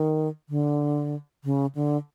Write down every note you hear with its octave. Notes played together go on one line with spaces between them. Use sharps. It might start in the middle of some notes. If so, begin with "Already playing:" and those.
Already playing: D#3
D3
C#3
D3